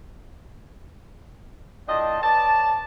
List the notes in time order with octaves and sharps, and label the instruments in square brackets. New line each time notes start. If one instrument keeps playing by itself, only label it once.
[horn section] A2 D4 F4 D#5 G5 A5
B4 C#5 D5 A5